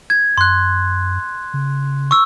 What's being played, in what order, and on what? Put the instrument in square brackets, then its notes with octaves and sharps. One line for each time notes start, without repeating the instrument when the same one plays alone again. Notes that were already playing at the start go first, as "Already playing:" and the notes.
[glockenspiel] G#6
[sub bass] F#2 [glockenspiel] C6 F#6
[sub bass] C#3
[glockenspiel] C#6 E6